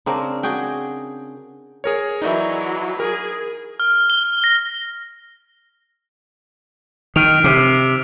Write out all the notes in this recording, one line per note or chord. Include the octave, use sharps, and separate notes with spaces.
C#3 C4 D4 A#4
F#4 G#4 G5
G#4 A#4 C#5
E3 F#3 D#4 D5 E5
G#4 A#4
F6
G7
A#6
D#3 F6 D7 F7
C3